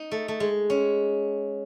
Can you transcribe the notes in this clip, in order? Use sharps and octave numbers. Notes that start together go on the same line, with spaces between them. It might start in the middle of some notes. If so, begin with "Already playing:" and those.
Already playing: D#4
A3
A3
G#3
C#4